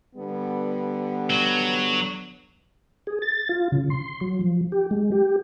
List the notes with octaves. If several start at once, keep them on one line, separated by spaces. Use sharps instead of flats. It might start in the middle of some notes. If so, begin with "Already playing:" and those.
D3 G3 B3
F#3
G#4
A6
F4
C#3
C6
F#3
F3
G4
G#3
G4